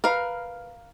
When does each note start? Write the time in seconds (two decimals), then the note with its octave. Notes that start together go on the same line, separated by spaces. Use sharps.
0.04 A#4 B4 F5